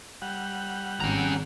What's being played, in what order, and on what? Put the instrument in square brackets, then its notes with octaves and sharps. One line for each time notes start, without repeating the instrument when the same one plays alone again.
[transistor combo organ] G3 F#5
[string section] G#1 [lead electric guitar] C#4 A#5